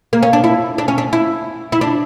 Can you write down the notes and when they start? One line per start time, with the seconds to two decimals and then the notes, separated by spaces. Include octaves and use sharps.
0.13 A#3
0.23 C#4
0.33 D4
0.44 E4
0.78 D4
0.88 C#4
0.98 D4
1.13 E4
1.72 E4
1.81 D4